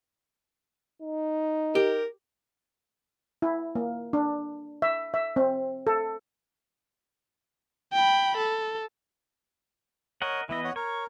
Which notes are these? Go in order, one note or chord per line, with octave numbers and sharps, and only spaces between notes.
D#4
G4 A#4
E4
A#3
D4
E5
E5
C4
A4
G5 B5
A4
A#4 C#5 D#5 F#5
E3 B3 E4 D#5
C#5 F#5
A#4 C#5